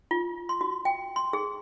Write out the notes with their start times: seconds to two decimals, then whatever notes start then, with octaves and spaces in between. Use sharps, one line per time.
0.11 F4
0.49 C6
0.61 F#4
0.85 G5
1.16 C6
1.33 G#4